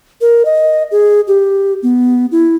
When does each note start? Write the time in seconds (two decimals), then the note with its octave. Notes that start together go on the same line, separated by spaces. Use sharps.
0.21 A#4
0.45 D#5
0.91 G#4
1.27 G4
1.83 B3
2.32 E4